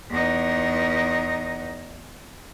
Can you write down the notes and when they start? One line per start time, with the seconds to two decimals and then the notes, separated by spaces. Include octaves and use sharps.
0.10 E2 D#4